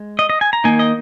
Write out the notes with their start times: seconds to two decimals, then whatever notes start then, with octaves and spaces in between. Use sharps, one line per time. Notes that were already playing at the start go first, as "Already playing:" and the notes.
Already playing: G#3
0.19 D#5
0.30 D#5
0.41 G#5
0.53 A#5
0.64 D#3 A#3 D#4 G#5
0.79 D#5